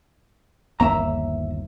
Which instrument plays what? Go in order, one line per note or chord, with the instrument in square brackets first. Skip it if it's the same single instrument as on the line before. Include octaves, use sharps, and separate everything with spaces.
[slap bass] G1 D#2 A#3 [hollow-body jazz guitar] E5 A#5